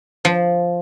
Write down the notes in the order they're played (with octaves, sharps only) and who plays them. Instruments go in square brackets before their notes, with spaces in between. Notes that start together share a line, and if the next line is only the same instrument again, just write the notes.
[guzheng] F3